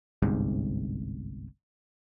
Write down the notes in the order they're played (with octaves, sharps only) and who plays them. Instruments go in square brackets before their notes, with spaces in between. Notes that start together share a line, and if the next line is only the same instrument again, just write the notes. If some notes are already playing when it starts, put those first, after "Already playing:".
[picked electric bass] G1 C2 G#2